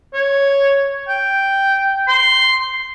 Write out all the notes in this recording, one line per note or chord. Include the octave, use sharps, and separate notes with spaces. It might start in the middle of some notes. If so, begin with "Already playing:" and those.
C#5
G5
C6